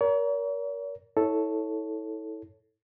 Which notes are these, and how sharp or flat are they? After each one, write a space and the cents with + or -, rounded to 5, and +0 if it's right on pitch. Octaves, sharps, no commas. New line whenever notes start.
A#4 +20 C#5 +45
E4 -35 A4 +0 C#5 +0